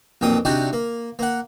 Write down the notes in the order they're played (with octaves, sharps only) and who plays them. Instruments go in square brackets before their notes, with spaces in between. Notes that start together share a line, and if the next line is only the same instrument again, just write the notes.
[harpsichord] B1 F2 A#2 G5 D#6
C3 D4 D#4 F#4 G4
A#3
A#3 F#5